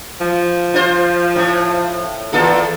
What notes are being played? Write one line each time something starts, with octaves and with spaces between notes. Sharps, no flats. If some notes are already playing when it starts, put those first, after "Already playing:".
F3
F4 C5
A2
E2 B3 F4 A4